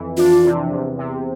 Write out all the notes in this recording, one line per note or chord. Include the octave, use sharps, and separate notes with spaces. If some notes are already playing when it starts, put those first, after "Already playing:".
Already playing: F2 E3
D4 F4
C3
E2
C3